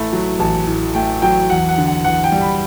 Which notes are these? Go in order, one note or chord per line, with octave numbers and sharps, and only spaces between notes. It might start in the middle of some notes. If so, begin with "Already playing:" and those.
Already playing: A1 A2 A3 B5
F#3
A1 A5
A2
A3 G5
F#3 G5
E2 F#5
F#5
D3
F#5
E2 F#5
G5
G3
B5